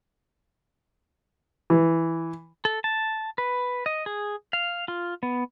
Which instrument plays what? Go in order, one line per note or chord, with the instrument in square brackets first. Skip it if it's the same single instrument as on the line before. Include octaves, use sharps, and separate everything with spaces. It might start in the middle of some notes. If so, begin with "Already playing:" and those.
[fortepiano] E3
[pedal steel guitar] A4
A5
B4
D#5
G#4
F5
F4
B3